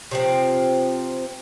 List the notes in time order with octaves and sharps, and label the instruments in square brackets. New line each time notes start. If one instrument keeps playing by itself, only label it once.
[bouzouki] C3 F3 C4